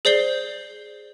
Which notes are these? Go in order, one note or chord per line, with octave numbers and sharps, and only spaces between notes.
G#4 C5 D5 G6 C7 G7